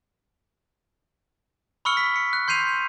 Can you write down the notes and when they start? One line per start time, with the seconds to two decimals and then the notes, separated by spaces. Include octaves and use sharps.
1.85 B5 C#6 E6 F6 C#7 G7
1.97 B6
2.16 C#7
2.33 F#6
2.48 C6 G6 C7 D#7 F7